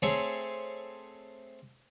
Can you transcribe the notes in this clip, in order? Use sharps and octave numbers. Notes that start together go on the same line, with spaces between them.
A3 C4 G#4 C5 C#5 G#5